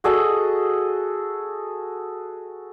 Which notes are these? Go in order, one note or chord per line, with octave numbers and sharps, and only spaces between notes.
F#4 G#4 A4 D#5